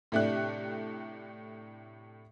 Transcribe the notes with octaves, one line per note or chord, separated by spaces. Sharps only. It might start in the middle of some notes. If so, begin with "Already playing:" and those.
A2 C3 A3 D4 G4 F#6